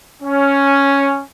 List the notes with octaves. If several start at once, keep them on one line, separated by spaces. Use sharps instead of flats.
C#4